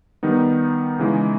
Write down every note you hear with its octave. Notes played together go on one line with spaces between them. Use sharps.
D#3 G3 B3 D#4
C#3 E3 G#3 D#4